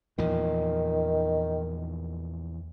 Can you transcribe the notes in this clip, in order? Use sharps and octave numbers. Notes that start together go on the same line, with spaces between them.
E2 A#2 D#3 F3